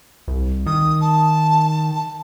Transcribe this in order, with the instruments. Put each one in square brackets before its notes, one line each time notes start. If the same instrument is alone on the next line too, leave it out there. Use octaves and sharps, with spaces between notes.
[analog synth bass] C2
[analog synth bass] D#3 [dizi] D#6
[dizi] A5